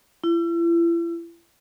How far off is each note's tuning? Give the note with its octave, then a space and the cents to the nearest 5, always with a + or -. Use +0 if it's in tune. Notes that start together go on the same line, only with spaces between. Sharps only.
E4 +40